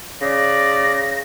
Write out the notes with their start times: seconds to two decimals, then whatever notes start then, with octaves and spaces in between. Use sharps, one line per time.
0.21 C#3 D5 A#6